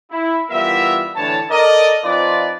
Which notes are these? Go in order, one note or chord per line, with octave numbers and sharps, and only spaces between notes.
E4
E3 G3 B3 F4 A#4 E5
A2 D3 E3 D4 C#5 A5
A4 A#4 D5 D#5
F3 C4 D#4 F4 B4 D5